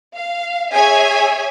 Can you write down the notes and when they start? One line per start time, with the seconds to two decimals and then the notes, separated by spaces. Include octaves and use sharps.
0.13 F5
0.72 G#4 C#5 E5 G#5